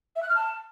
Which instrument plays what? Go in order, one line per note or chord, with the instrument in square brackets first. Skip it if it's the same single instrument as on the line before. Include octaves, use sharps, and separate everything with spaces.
[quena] E5
F#6
F6
A5